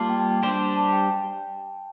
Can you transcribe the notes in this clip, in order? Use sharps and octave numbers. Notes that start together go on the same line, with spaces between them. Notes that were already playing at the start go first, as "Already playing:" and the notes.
Already playing: G3 A#3 F4 A5
G5
A5
G5
G3 D4 G4 C5
A5
A5
G5